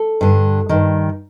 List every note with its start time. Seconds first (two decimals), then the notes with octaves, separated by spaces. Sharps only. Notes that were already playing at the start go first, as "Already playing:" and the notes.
Already playing: A4
0.21 G2 D3
0.69 G2 D#3